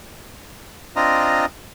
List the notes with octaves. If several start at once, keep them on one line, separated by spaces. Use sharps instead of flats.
C4 D4 F4 D#5 A#5